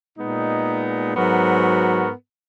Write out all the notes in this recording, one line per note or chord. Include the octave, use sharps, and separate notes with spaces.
A#2 G#3 B3 D#4
G#2 F#3 B3 F#4 A#4